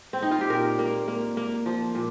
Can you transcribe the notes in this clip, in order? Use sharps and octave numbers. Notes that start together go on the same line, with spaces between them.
C4
D#4
F4
G4
A#2 A#4
A#3
A#3
A#3
F3
A#2